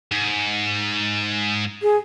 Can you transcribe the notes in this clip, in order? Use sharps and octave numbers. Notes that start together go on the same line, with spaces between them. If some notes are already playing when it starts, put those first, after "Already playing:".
G#2
G#4